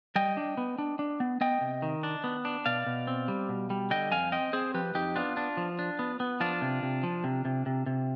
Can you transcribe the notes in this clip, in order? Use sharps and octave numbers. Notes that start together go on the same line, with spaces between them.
G3 D#5 G5
D4
B3
D4
D4
B3
B3 D#5 G5
C3
D#3
D4
B3
D4
B2 D5 F5
B2
C4
G3
B2
G3
D3 D#5 G5
F2 F5 G#5
C4 D#5 G5
C4 G#4 C5
F3 G4 B4
F2 D#4 G4
B3 D4 F4
D4
F3
D4
B3
B3
F3 D4 F4
C3
C3
F3
C3
C3
C3
C3